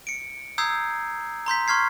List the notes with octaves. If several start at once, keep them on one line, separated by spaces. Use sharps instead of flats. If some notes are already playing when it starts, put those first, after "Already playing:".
C#7 D7
A#5 D#6 E6 G6 G#6 C7
A#5 C6 G6 B6
C6 C#6 F6 G#6 C7